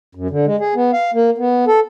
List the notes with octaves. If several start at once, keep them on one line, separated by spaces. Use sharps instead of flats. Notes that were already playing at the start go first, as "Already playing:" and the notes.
F#2
D3
G#3
G#4
B3
F5
A#3
B3
A4